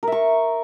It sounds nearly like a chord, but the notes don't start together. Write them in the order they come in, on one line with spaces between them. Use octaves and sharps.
A#4 E5 C#6